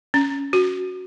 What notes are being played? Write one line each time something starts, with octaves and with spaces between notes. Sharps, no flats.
C#4
F#4